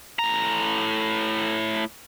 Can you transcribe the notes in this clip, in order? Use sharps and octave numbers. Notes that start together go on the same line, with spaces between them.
A2 A#5